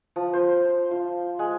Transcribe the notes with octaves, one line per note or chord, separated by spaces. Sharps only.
F3
C5
F4
G#3